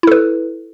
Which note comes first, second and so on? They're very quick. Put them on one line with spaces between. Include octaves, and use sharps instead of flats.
E4 A4 B4